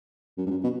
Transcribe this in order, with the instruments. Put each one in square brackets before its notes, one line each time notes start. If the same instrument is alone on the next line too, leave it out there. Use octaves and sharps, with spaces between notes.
[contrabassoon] F#2
G2
F#2
B2